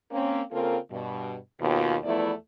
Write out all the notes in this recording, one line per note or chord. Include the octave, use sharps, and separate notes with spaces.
A#3 C4 C#4
C#3 A#3 C4 F4 A4 A#4
G2 B2
D#2 B2 F4
E2 F3 A3 B3 E4 D5